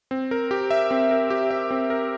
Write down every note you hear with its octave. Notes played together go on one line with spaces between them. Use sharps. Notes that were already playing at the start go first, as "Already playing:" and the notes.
C4
A#4
G4
E5
C4
A#4
G4
E5
C4
A#4